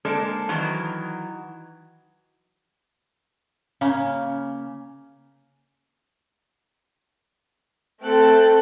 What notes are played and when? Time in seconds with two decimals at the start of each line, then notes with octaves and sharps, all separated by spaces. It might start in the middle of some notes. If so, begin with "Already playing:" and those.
0.05 G#3 A#3 D4 A4 C5 D5
0.49 D#3 E3 F#3
3.81 C#3 A#3 C#4
8.01 A3 C4 A4 G5 A5 F#6